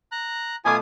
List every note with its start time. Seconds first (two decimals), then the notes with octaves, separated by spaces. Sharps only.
0.12 A#5 F#6
0.65 B2 A3 F4 G#5 D6 D#6